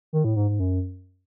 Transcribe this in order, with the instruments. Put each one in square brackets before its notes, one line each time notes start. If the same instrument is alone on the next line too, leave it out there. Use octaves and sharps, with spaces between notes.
[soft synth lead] D#3
A2
G#2
G#2
F#2